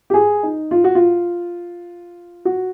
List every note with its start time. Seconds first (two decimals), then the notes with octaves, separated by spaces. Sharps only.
0.10 G4
0.14 G#4
0.43 D#4
0.71 F4
0.84 F#4
0.95 F4
2.45 F#4